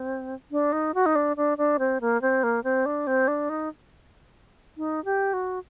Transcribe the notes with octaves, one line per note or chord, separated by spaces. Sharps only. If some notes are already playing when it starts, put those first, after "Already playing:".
Already playing: C4
D4
D#4
F#4
D#4
D4
D4
D4
C4
A#3
C4
A#3
C4
D4
C4
D4
D#4
D#4
G4
F#4